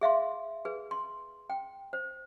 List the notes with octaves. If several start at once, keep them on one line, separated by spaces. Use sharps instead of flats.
G#4 E5 F5 C6
G#4 B4
C6
G5
C5